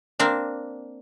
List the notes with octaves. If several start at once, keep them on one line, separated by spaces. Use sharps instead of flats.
A#3 C4 D4